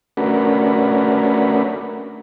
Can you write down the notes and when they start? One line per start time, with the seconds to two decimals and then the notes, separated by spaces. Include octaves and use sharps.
0.17 A3 C#4 D4 F#4 A#4 B4